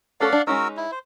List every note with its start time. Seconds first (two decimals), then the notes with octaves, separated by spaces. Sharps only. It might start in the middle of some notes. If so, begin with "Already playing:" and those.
0.21 A3 C#4 A4 D5 F5 F#5
0.33 D4
0.47 G#3 C#4 D#4 F#4 A#4 E6
0.77 E4
0.92 C5